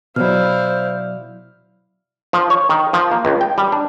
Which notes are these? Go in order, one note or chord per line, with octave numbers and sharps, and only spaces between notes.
B2 F#3 E4 C5 D5 F5 F6
F3
C#5
D#3
F3
A#3
C#2
G5
G3
D4